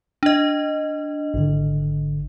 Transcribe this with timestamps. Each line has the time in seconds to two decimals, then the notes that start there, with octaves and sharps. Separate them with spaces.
0.23 D4 D#5
1.34 G#1 D3